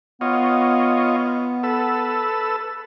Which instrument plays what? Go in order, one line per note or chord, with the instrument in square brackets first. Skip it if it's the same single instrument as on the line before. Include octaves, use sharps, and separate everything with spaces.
[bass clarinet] B3 [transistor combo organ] F4 C#5 D#5
[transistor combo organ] A4 B4 E6